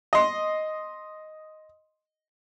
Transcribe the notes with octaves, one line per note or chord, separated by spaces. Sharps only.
D#5 C6